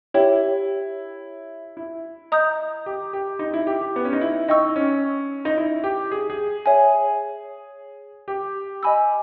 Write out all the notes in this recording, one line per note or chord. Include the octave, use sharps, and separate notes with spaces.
E4 G4 C#5 G5
E4
D#5 A#5 D#6 G6
G4
G4
D#4
E4
G4
G4
B3
C#4
D#4
E4
D#4 D#5 G5 C#6 E6
C#4
D#4
E4
G4
G#4
G#4
C#5 E5 G#5
G4
D#5 G#5 B5 E6